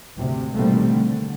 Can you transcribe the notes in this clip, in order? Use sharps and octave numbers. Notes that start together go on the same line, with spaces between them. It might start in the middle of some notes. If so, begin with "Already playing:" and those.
D2 G#2 C3
B2 D#3 G3 A3 A#3 C4
D3